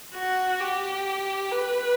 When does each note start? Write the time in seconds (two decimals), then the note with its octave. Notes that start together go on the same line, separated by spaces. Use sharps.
0.15 F#4
0.60 G4
1.51 B4